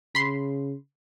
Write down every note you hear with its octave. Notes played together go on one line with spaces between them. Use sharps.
C#3 B5 C6